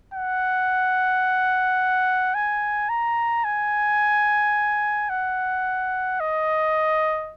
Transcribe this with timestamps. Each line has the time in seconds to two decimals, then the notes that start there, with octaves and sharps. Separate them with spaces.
0.14 F#5
2.35 G#5
2.89 A#5
3.44 G#5
5.10 F#5
6.20 D#5